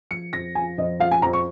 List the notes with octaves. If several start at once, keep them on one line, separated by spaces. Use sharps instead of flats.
F3 C#7
F2 A#6
F3 G#5
F2 D#5
F3 F5
G#5
F2 A#5
C#6